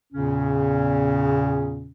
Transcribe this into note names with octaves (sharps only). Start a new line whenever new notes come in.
E2 A#2 C#3 C#4